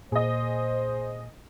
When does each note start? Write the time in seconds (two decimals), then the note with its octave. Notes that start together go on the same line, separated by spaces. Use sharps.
0.12 A#2 G#4 C5 D#5